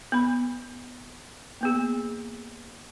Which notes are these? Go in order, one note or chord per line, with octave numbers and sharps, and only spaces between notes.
B3 B5
A#3 B3 G#4